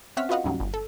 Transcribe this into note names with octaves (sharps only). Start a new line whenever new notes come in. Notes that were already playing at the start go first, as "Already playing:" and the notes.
C4 C#4 E5 F#5 F6 B6
F4 F#4 B4 D#5 F5 F#5
D#2 A2 C#3 F#3 G3
G1
A4